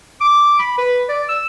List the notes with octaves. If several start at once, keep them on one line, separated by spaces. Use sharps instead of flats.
D6
B5
B4
D5
E6